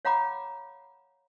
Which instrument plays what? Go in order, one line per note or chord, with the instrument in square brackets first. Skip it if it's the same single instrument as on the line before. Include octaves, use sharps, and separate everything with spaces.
[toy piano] C#5 F5 F#5 A#5 B5 D6